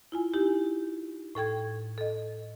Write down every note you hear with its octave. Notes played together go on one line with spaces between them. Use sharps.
E4 F4 G#5
D#4 E4 G4
A2 A4 G5 G#6
A4 D#5